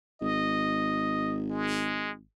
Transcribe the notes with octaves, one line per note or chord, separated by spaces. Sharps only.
G#1 D#5
G#3